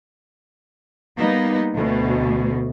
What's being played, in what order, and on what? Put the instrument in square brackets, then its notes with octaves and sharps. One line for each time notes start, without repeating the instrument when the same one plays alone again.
[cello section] G3 A#3 B3 D#4
D2 B2